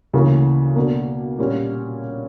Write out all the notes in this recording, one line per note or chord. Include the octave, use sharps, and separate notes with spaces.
D2 C#3 E3 A#3
B2 A#3 D4
A#2 G3 C#4